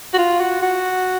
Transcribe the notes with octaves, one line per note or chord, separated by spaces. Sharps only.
F#4
F4
F#4
F#4